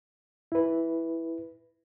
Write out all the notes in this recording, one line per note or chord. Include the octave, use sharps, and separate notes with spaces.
E4 B4